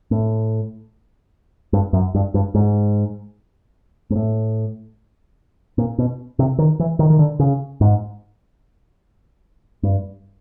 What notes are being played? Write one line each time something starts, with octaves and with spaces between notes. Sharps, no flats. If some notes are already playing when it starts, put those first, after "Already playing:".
A2
G2
F#2
G2
G2
G#2
G#2
A2
A#2
B2
C3
D#3
E3
D#3
D#3
D3
C#3
G#2
G2